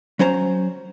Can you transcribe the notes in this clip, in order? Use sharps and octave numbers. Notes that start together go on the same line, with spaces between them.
F#3 C#4 C5 A#5